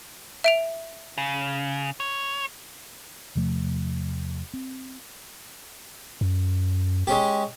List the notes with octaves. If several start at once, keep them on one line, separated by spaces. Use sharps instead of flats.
E5 D7 F7
C#3
C#5
E2 C3 F3 A3
C4
F#2
G#3 C#4 G4